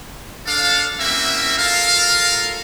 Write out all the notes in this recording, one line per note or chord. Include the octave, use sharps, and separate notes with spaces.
D4 A4 F5
A#3 C4 C#4 E4 F#4 E5
F4 A4 A#4 F5